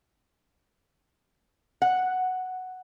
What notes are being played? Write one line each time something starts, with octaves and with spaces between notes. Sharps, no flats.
F#5